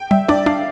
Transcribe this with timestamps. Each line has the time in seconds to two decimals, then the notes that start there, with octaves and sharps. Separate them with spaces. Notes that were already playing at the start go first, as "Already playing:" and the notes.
Already playing: G5
0.11 G3 E5
0.28 D4 D5
0.46 D4 F5